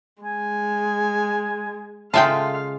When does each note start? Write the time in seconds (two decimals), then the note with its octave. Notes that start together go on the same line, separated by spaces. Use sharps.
0.23 G#3 G#5
2.14 C#3 G#3 F4 A4 E5 F5 G5